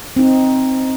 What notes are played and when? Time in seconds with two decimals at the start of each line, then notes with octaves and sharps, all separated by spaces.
0.16 C4 D#4